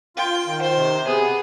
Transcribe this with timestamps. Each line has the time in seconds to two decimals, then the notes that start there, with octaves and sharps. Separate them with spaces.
0.17 F4 G5
0.47 D#3
0.62 C5
0.76 C3
1.07 B3 G#4